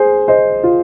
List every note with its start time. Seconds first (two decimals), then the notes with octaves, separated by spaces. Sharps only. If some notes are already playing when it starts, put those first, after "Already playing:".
Already playing: G#4 C5
0.28 C5 D#5
0.63 F4